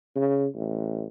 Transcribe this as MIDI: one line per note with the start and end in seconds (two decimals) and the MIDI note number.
0.16 0.47 49
0.55 1.06 33